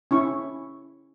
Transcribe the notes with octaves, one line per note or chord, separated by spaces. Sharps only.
C#4 E4 C#6